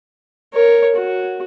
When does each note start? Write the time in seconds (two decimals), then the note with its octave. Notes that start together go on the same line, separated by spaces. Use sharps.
0.54 A#4 C#5
0.96 F#4